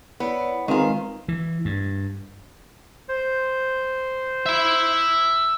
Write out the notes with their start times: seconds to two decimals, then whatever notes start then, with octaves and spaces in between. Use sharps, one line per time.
0.20 B3 E4 C#5 D5
0.68 D#3 G#3 C4 F4 B4 G#5 A#5
1.28 E3
1.65 G2
3.09 C5
4.46 E5 B5